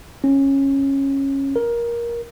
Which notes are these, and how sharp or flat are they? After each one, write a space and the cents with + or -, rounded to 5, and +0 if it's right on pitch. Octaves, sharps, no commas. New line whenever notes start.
C#4 -15
A#4 +15